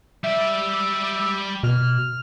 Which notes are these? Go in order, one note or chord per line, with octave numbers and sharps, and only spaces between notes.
G3 D5 E5
B2 F6